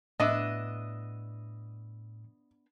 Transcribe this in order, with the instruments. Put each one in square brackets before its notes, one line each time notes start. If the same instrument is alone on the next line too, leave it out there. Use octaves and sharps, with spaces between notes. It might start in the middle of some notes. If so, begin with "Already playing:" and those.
[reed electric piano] A2 E6 [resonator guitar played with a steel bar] B3 D4 E5 [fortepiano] D#5